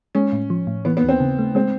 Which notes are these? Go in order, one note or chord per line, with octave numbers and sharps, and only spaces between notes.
G#3 C#4
A2
F3
A2
E3 B3
B3
D#2
C4
C#3
A3
G#3 C4